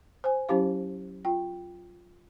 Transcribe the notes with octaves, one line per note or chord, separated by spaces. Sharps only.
C5 G#5
F#3 C#4 E4 G4 F5
F4 G5